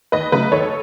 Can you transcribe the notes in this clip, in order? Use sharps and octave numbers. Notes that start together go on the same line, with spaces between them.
D#2 B4 D#5
C#3 F#3 A3 B4 D#5
D#2 A4 C#5